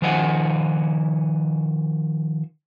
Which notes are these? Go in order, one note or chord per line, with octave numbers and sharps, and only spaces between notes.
D#3 F3 C5 D#5 F#5 G#5